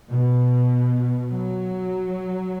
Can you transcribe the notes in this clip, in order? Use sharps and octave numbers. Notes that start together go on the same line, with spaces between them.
B2
F#3